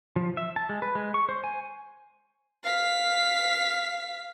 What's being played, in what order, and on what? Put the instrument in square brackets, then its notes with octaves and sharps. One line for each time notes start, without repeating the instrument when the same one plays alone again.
[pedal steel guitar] F3
E5
A5
G#3
B4
G#3
C#6
C5
G#5
[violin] F5 B6